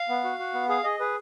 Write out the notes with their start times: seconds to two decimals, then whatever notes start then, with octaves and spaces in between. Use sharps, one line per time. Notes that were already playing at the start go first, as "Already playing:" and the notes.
Already playing: F5
0.09 B3
0.24 F#4
0.39 F#4
0.54 B3
0.69 G#4 F5
0.84 G#4 D#5
1.00 G#4 B4